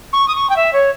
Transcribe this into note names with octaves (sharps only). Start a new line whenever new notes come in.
C#6
D#6
C#6
G5
E5
C#5